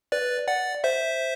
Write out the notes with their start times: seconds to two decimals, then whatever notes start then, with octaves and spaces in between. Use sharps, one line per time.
0.12 B4 D5
0.48 D5 F#5
0.84 C5 E5